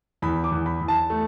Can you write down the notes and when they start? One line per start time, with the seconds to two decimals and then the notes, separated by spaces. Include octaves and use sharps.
0.22 E2 B5
0.44 D6
0.52 E2
0.66 B5
0.81 E2
0.88 A5
1.10 A3